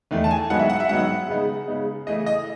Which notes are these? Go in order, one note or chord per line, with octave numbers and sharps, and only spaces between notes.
E2 D#3 A3 D#4
A5
G#5
G#2 D#3 F#3 B3 D#4 F#5
E5
F#5
E5
G#2 D#3 F#3 B3 D#4 F#5
C#3 G#3 B3 D#4
C#3 G#3 B3 D#4
C#3 E3 A3 D#5
D#5